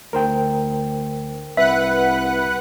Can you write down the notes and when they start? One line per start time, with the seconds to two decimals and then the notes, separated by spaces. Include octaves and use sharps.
0.13 D2 A#4 C5 G5
1.57 C2 B4 E5 F#5 F#6